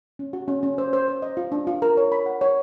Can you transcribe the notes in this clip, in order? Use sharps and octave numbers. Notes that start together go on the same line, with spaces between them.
C#4
F#4
C#4
C#4
C5
C5
C5
D#5
F4
D4
F4
A#4
C#5
B5
F#5
C#5